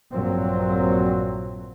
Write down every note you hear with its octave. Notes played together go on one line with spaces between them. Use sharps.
A#1 G2 A#2 F#3 C4